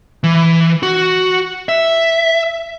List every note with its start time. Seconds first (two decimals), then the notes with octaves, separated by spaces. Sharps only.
0.24 E3
0.83 F#4
1.69 E5